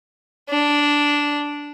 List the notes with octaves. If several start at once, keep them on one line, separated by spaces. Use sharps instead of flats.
D4